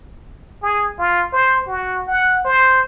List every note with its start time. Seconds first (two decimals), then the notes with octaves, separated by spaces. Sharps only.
0.63 G#4
0.99 F4
1.33 C5
1.67 F#4
2.07 F#5
2.45 C5